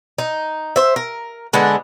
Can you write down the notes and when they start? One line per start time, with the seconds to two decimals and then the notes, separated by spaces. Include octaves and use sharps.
0.18 D#4
0.76 C5 E5
0.96 A#4
1.53 D3 G#3 B3 D4